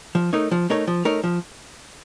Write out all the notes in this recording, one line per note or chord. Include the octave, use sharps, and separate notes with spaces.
F3
A3 D#4 A#4 C#5
F3
A3 D#4 A#4 C#5
F3
A3 D#4 A#4 C#5
F3